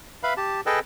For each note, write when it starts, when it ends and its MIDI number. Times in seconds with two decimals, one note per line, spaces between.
0.23 0.34 71
0.23 0.34 76
0.23 0.34 77
0.23 0.34 83
0.37 0.61 67
0.37 0.61 81
0.66 0.80 68
0.66 0.80 69
0.66 0.80 71
0.66 0.80 75
0.66 0.80 79
0.66 0.80 81